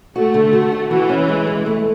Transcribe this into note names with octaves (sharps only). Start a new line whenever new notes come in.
A3 F#4
D3
F#4
F#4
E3 F#4
C#4
G#3
G#3
A3